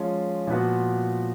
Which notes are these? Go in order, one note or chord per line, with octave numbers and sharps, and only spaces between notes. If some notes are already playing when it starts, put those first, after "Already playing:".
Already playing: F3 G#3 C#4 F4
A#2 F3 B3 F#4